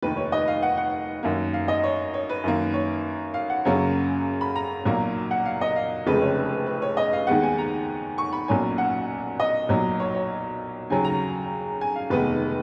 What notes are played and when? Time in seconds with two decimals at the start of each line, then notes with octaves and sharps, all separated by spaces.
0.02 F1 D#2 D#3 B4
0.17 C#5
0.32 D#5
0.48 F5
0.62 F#5
0.77 F#5
1.23 F#2 D#3 A#3
1.54 F5
1.68 D#5
1.84 C#5
2.14 C#5
2.29 B4
2.44 F#2 D#3 A#3
2.74 C#5
3.34 F5
3.50 F#5
3.65 F#2 C#3 F#3 A#3 C#4
4.41 B5
4.56 A#5
4.85 B1 A#2 F#3 A#3
5.31 F#5
5.46 F5
5.61 D#5
5.76 F5
6.07 F1 F2 C#3 G#3 B4
6.22 C#5
6.66 B4
6.82 C#5
6.97 D#5
7.13 F5
7.27 D#2 D#3 G#3 B3 F#5
7.43 G#5
7.58 A#5
8.18 C#6
8.33 B5
8.48 B1 A#2 F#3 C#4 G#5
8.78 F#5
9.40 D#5
9.69 B1 A#2 F#3
10.00 C#5
10.15 C#5
10.90 D#2 C#3 F#3 G#5
11.05 A#5
11.81 G#5
11.96 F5
12.10 F1 D#2 D#3 G#3 B3 B4